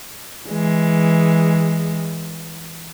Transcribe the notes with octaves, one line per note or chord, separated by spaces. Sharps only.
E3 G#3